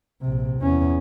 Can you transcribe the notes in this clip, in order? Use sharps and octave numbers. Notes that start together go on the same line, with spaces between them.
A#1 C3
E2 C#4